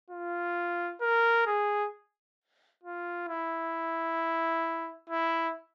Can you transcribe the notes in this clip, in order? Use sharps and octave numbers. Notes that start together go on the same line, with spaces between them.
F4
A#4
G#4
F4
E4
E4